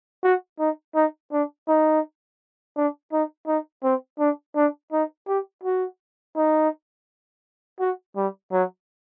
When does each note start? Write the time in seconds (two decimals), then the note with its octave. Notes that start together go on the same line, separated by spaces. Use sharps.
0.23 F#4
0.59 D#4
0.95 D#4
1.32 D4
1.68 D#4
2.76 D4
3.12 D#4
3.47 D#4
3.84 C4
4.19 D4
4.56 D4
4.92 D#4
5.28 G4
5.63 F#4
6.36 D#4
7.80 F#4
8.16 G3
8.52 F#3